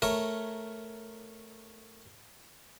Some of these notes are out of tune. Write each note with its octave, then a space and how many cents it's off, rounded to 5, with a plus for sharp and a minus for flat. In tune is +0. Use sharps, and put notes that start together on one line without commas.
A3 +0 A#4 +0 C#5 +0